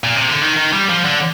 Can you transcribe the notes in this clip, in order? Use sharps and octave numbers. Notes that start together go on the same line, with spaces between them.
A#2
C3
D3
D#3
D#3
G3
F3
D3